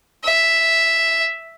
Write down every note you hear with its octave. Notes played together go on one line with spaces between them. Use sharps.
E5